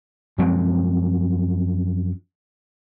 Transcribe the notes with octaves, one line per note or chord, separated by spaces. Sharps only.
F#2 F3 G#3 C4